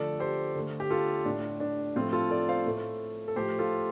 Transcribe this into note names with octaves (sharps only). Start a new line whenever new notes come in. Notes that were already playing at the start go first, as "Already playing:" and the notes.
Already playing: D3 F3 A3 A4 D5
G4 C5
D3 A3
G4
F4 A4
A2 A3 D4
D4
A2 F3 A3 C4 F4
F4 A4
A4 D5
C5 F5
A2 A3
A4
A2 F3 A3 G4 C5
F4 A4